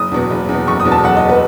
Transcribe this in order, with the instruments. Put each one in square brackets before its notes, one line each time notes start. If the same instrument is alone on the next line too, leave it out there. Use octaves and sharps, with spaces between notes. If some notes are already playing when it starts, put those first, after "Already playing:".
Already playing: [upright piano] F#1 D#6
E2 B2
F#1
E2 B2
F#1 C#6
D#6
E2 B2
A5
F#1 F#5
D#5
B2
B4